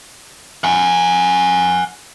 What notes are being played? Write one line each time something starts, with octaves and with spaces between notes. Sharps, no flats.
F#5 G#5